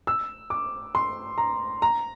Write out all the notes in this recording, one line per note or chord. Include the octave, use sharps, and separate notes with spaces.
E6
D6
C6
A#5
A#5